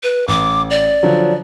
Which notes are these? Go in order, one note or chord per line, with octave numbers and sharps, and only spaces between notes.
B4
A1 D6
D5
D3 F3 F#3